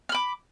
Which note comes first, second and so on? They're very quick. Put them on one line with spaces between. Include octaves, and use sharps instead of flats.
F6 B5 D6